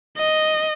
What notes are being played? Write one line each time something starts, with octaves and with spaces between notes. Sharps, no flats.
D#5